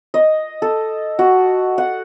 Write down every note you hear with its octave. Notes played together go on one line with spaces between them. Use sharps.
D#5
A4
F#4
F#5